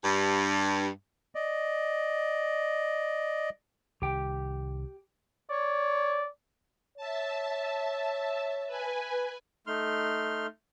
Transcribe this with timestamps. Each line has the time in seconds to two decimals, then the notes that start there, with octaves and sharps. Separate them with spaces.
0.04 G2
1.35 D5 D#5
4.02 C2 D#3 G4 G5
5.51 C#5 D5
6.97 C#5 E5 A5
8.67 B4 G#5
9.67 A3 D#4 C6 F6